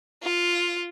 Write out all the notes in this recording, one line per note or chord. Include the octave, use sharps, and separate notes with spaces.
F4